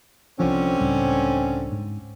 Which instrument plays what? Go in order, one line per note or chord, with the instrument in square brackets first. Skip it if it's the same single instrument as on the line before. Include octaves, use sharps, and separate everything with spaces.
[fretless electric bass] C2 F3 [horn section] D3 C4 C#4
[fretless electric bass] C#2 A2 G3
G#2